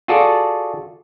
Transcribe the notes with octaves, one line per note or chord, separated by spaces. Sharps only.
F4 F#4 G#4 A4 D5 A5